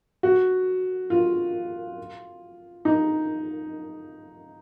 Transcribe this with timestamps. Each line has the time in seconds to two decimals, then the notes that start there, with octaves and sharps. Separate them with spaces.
0.23 F#4
1.10 F4
2.85 D#4